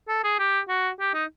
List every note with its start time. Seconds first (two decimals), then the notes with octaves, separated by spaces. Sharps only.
0.09 A4
0.24 G#4
0.39 G4
0.68 F#4
1.00 G4
1.14 D#4